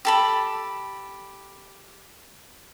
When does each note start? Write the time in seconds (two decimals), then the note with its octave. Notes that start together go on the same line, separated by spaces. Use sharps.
0.05 G4 A4 B5